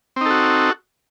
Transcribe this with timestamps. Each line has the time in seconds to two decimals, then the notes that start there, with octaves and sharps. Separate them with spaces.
0.16 C4
0.21 D#4
0.26 A4
0.30 F#4